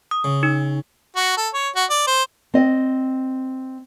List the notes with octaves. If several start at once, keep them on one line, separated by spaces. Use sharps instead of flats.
D#6
C#3
D#4
F#4
A4
C#5
F#4
D5
C5
C4 D#5